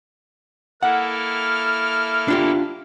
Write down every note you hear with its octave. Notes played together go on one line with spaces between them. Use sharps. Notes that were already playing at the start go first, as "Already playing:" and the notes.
A#3 E4 A4 F#5 F6
D4 F4 G4